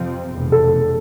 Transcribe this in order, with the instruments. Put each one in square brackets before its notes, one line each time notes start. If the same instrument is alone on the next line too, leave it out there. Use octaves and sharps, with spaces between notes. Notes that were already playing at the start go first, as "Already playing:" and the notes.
Already playing: [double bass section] F2 C3 F3 C4
F1 E2 B2
[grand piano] A4